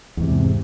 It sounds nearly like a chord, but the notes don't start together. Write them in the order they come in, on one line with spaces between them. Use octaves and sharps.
E2 G#2 C3